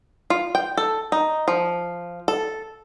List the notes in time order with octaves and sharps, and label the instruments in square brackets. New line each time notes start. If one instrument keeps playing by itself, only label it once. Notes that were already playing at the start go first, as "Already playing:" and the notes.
[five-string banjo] F4
G5
A4
D#4
F3
A4